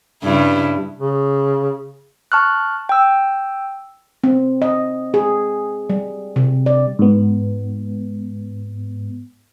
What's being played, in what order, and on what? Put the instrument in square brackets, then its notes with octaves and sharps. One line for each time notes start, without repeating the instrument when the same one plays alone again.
[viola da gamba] G2 C#3 E4
[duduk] C#3
[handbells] A5 C#6 F6 F#6
G5 E6
[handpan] C4
D#5
G#4
G3
C3
D5
[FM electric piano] G#2 B3